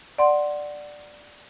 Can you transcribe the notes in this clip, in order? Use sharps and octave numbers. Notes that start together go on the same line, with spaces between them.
D5 F#5 C6